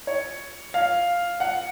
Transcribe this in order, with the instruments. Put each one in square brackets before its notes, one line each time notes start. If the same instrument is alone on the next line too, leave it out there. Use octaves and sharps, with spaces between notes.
[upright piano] C#5
F5
F#5